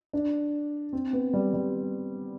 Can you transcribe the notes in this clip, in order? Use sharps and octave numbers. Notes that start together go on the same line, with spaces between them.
D4
C4
B3
G3
G3